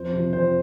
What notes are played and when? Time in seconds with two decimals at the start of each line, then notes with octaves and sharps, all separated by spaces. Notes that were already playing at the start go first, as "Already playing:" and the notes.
Already playing: F2 C5
0.13 C3 F3
0.33 F2 C5